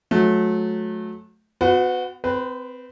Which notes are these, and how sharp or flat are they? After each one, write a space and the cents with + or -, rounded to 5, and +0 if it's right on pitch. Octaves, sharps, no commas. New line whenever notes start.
F#3 -25 A3 -25
B3 +35 F#4 -20
C4 -25 B4 +0